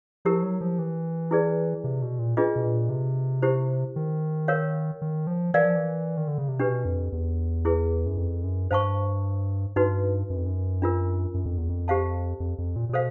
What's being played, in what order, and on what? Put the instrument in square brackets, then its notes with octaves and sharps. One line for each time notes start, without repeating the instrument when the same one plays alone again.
[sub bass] F3 [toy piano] E4 G4 A#4
[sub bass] F#3
F3
E3
[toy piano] E4 G#4 B4 D5
[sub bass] C3
B2
A#2
[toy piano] D4 F4 G#4 B4 D#5
[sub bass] B2
A#2
C3
[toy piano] E4 G4 C5
[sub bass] D#3
[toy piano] A#4 C#5 F5
[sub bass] D#3
F3
[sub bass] E3 [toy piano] A#4 D5 F5 G#5
[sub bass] F3
E3
D#3
D3
C#3
C3
[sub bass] B2 [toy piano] D4 G4 B4
[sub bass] F2
E2
[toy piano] E4 G#4 B4
[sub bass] F#2
F2
F#2
[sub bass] G2 [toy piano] C5 F5 A5 C#6
[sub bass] G2 [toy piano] D#4 F#4 B4
[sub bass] F#2
F2
F#2
[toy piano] D4 F4 A#4
[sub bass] F#2
F2
E2
F2
[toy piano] G4 C5 F5 A5
[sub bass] F2
F2
A#2
A#2
[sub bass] B2 [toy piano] A4 C5 F5